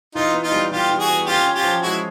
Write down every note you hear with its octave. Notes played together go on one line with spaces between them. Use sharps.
E3 D#4 F4
B3
D#4 F4
G3
E3 F4 G4
E3
F#4 G#4
B3
C#4 F4 G4
C#4
F4 G4
F3
G#3 E4 F#4